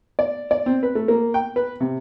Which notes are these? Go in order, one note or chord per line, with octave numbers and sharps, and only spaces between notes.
D5
D5
C4
B4
A3
A#3
G5
B4
C3